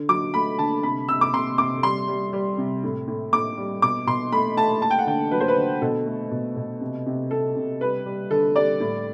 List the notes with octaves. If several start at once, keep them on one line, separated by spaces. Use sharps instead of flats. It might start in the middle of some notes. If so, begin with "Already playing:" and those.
Already playing: D3
F#3 D6
A3 B5
D3 A5
C3 B5
C3 E6
D6
C3 C6
C3 D6
G3 C6
G3
G3
C3
A2
A2
A2 D6
G3
B2 D6
B2 C6
A3 B5
A3 A5
A3 A5
G5
F#5
D3 G5
F#3 B4
C5
B4
D3
B2 A4
A3
B2
B2
C3
C3
C3 A4
C3
G3 B4
G3
D3 A4
G3 D5
A2